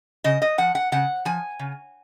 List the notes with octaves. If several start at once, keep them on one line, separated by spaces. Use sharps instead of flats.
C#3 D#5
D#5
F3 F#5
F#5
C#3 F#5
F3 G#5
C#3